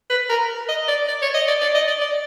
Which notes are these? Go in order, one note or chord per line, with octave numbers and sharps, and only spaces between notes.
B4
A#4
D#5
D5
D5
C#5
D#5
D5
D5
D#5
D5
D5